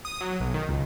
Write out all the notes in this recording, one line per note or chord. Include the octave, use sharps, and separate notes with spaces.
D#6
F#3
B1
D#3
C#2